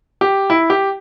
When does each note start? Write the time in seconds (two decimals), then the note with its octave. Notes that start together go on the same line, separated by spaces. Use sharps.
0.21 G4
0.50 E4
0.70 G4